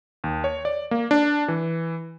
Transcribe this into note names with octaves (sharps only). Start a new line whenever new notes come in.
D#2
C#5
D5
A#3
D4
E3